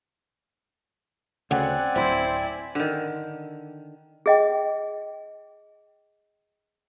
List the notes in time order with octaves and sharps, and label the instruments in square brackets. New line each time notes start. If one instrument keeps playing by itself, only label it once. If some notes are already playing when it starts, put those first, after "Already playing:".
[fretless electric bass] D2 C#3 [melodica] C4 D5 G#5 [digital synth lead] F#5
[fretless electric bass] D1 [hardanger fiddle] E4 [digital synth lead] C5
[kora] D3 D#3
[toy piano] G#4 D#5 G5